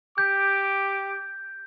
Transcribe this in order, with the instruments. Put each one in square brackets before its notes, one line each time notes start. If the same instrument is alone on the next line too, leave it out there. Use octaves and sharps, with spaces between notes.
[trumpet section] G4 D6 [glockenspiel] G6